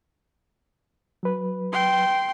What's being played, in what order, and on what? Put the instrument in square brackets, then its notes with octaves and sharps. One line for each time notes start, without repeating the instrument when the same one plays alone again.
[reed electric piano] F#3 B4
[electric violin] G5 C6